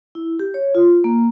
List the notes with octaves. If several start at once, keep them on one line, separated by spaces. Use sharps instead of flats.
E4
G4
C#5
F4
A#3